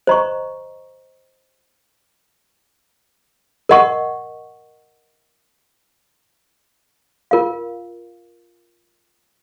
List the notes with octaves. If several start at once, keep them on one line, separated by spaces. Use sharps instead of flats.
C5 D#5 A#5 C#6
A#4 D#5 F#5 C#6
F4 A#4 F5